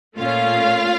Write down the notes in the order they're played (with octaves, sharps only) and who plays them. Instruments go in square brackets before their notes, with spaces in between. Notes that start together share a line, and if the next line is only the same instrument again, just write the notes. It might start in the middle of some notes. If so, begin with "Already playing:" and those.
[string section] A#2 A3 C#4 F4 F5